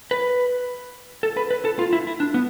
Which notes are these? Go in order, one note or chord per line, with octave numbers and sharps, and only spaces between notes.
B4
A4
B4
B4
A4
F4
E4
E4
D4
B3